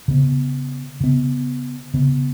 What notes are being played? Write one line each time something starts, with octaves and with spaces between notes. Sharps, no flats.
C#3 B3
C#3 B3
C#3 B3